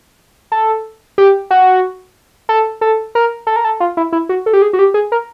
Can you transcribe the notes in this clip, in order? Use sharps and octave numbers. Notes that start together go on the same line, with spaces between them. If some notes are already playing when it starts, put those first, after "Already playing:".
A4
G4
F#4
A4
A4
A#4
A4
A#4
A4
F4
E4
E4
F#4
A4
G4
G#4
F#4
G4
G#4
A#4